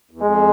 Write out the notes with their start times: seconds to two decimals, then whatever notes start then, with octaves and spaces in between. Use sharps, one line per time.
0.11 E2
0.21 F2 G#3